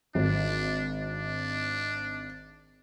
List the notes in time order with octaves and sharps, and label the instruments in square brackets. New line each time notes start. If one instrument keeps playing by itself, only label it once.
[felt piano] G#1 [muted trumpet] D4
[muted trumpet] D4